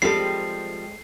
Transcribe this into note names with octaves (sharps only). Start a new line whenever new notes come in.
F3 G3 G#3 C4 G4 A4 C7